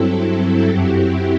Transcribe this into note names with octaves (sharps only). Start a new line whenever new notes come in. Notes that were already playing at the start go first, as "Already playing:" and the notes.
Already playing: G2 F#3 C4 E4 A4
F#2 F#3 C4 E4 G4